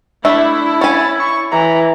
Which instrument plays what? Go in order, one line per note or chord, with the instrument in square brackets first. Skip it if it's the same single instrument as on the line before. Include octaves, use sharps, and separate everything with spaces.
[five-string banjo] A3 E5 [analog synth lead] D4 [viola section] E4
[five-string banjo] C#4 G#5 [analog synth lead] A6
[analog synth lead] C#6
[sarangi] E3 [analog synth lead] A#5